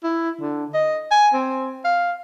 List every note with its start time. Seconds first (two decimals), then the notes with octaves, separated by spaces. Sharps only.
0.04 E4
0.41 D3
0.74 D#5
1.11 G#5
1.33 C4
1.85 F5